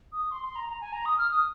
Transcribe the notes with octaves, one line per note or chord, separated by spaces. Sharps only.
D#6
C6
C6
A#5
A#5
G#5
A#5
D#6
F6
D#6